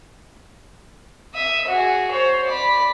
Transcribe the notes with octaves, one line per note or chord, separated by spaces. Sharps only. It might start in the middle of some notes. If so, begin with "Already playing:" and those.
E5 D#6
F#4 G#4
C5 C#5
D5 B5